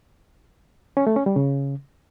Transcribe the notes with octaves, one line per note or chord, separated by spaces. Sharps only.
C#4
A3
C#4
G3
C#3